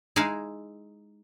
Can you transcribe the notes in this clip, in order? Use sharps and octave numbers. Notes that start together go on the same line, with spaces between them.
G#3 D#4 E4 G#4 F5